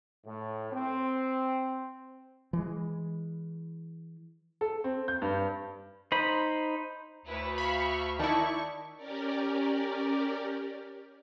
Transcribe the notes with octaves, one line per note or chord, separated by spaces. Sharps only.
A2
C4
E3 G#3
A4
C4
G6
G2
D#4 C5 B5
D2 E4 B4 C#5
E5 F5 B5 C#6
D#3 D#4 E4 D5 A5 C#6
C#4 G4 A#4 D5